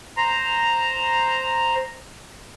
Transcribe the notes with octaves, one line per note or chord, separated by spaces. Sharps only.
C5 A#5